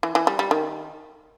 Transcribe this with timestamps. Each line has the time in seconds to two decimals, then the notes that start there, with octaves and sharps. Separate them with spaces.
0.03 E3
0.15 E3
0.27 G3
0.39 G3
0.51 D#3